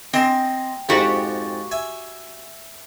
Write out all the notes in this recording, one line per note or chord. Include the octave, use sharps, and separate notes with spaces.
C4 D#5 G#5 C6
F2 G#2 F#4 G4
E5 G#5